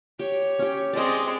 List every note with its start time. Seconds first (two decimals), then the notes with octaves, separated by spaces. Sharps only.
0.19 G4 C#5
0.59 C#4 G4
0.93 G#3 C4 D5 D#5